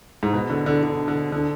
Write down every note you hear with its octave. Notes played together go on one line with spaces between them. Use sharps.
G#2
B2
D3
D3
D3
D3
D3